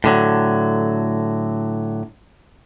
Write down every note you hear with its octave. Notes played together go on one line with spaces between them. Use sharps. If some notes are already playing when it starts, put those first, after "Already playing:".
A2 D3 F#3